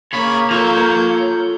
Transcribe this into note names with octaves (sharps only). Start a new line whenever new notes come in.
C#3 A#3 C#5 B5
F4 A4 C#5 A#5 C#6 G6